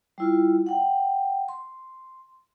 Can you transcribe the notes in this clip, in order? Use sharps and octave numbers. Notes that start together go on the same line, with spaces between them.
G3 E4 F4
F#5 G5
C6